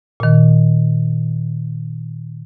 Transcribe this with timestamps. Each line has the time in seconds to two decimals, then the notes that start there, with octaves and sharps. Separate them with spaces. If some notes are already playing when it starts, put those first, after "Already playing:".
0.20 A#2 D#3